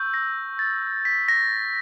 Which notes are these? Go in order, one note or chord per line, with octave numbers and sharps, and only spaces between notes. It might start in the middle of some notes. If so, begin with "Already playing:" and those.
Already playing: C#6 E6 G6
A#6
A6
B6
A#6